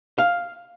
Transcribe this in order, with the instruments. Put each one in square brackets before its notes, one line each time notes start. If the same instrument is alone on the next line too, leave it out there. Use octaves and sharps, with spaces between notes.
[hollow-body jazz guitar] F5